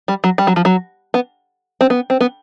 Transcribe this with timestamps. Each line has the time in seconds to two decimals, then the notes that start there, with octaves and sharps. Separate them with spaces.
0.08 G3
0.24 F#3
0.38 G3
0.47 F#3
0.56 F3
0.65 F#3
1.14 B3
1.81 C4
1.90 B3
2.10 C4
2.21 B3